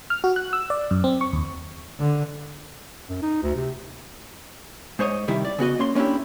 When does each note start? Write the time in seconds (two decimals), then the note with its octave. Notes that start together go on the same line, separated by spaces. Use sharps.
0.10 F6
0.24 F#4
0.36 F#6
0.53 E6
0.70 D5
0.91 F#2
1.04 C4
1.21 C#6
1.33 D#2
1.99 D3
3.09 F#2
3.22 D#4
3.43 D2
3.56 C3
4.99 G#2 C5 C#5 D#5
5.28 C3 D#3 G3 E4
5.45 D5
5.59 C#3 B3 F#4 D#5
5.79 A#3 C#4 C6
5.95 A#3 C#4 D4 E4 G4